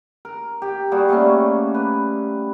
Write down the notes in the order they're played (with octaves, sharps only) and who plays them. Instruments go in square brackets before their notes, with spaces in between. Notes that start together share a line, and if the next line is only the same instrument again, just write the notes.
[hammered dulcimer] A#4
G4
G3 A#3 F#4 G#4
G3 A3 A#3 C#4
B4